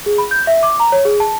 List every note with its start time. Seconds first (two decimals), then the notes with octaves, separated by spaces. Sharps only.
0.06 G#4
0.18 B5
0.31 G6
0.47 E5
0.63 D6
0.80 A#5
0.92 C#5
1.05 G#4
1.20 A5